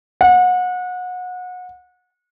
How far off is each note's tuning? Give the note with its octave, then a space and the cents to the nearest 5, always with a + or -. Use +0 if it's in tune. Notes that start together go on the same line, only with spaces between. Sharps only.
F#5 -30